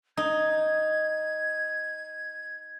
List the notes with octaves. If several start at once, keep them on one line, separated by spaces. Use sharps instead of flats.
D#4 G#6